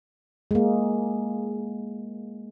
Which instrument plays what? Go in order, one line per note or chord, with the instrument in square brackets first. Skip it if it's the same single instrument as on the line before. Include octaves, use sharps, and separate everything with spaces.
[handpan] G#3 A#3